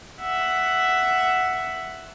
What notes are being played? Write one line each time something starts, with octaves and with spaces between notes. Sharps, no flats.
E5 F#5